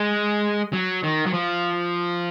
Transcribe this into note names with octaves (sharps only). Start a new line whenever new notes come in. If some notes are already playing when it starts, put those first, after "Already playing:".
Already playing: G#3
F#3
D#3
F#3
F3